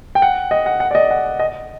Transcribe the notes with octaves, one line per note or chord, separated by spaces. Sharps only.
G5
F#5
D#5
F#5
F#5
D5
D#5
F#5
D#5